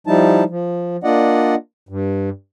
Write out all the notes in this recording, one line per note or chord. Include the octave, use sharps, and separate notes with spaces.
F3 G3 D#4 E4 A5
F3
A#3 D4 F4 D5 D#5 F#5
G2